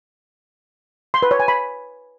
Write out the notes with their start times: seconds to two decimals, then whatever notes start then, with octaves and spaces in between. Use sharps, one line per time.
1.14 C6
1.22 B4
1.31 C#5
1.40 G#5
1.48 B5